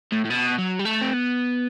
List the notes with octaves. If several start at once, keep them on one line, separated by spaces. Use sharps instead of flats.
A2
A2
B2
F#3
G3
A3
C4
B3